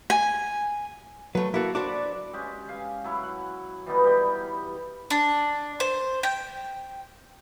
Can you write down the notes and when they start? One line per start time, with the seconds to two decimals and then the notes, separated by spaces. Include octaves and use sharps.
0.10 G#5
1.35 F#3 A3 B4
1.54 A#3 E4 F#4 A4
1.75 D4 F#4 C5 D5 B5 D6
2.33 G#3 C#4 G4
2.69 F5 G#5
3.04 F#3 E4 C#5 D6
3.23 F#5
3.86 E3 G3 B3 D#4
4.04 G3 G4 G5
5.10 D4
5.80 C5
6.23 G5